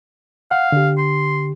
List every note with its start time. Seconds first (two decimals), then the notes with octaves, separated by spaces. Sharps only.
0.51 F5 F#5
0.72 D3 G4
0.98 C6